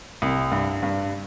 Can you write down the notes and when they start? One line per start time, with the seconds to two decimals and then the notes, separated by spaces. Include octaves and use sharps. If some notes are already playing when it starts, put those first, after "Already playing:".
0.22 C2
0.52 G2
0.83 G2